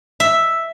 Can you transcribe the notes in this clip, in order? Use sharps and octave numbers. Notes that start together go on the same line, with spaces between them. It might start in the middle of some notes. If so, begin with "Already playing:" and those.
E5